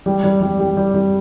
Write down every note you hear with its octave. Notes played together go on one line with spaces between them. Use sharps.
G3
G3
G3
G3
G3
G3